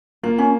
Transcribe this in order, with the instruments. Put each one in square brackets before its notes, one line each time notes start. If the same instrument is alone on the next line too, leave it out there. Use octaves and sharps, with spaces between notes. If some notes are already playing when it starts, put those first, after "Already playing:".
[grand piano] A#3 [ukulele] F4
[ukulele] C#4